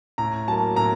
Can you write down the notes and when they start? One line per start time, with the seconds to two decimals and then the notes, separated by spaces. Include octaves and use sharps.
0.18 A2 A#5
0.48 F#3 A#3 A5
0.76 A2 A#5